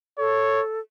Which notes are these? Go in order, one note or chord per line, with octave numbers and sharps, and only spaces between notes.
A4 C#5